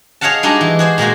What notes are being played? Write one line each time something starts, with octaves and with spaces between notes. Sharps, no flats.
G#4 C#5 D#5 F5 F#5 A5
G3 G#3 D4 D#4 F#4 G#4
E3
F#4 G#4 C5
A#2 G#3 A#3 F#4